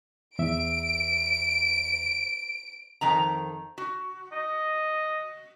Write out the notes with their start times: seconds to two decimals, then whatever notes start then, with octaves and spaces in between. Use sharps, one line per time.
0.39 E2 E5 D7
3.01 F2 D#3 A#5
3.78 F#4
4.32 D#5